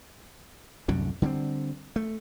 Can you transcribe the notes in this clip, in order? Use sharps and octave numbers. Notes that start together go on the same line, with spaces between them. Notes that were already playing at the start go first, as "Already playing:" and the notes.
C2 F#2 A2 D3
D3 G3 B3 C4
A3